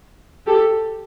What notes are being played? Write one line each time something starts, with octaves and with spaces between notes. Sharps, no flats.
G4 A4